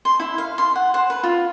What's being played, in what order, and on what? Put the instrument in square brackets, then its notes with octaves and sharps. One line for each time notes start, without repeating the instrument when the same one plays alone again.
[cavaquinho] C6
E4
F5
C6
F#5
C5
B4
F4